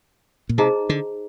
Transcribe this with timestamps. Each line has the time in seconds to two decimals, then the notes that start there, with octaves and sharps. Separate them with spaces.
0.49 A#2
0.58 C3 D#4 G#4 C5 D#5 A#5
0.89 D3